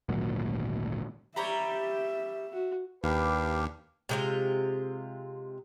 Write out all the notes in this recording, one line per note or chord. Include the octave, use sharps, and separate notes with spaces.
G#1 D2 A#2 F#3
G3 G4 C#5 E5 A#5 B5
F#4
D#2 D4 G4 B4 F5
C3 G#3 F4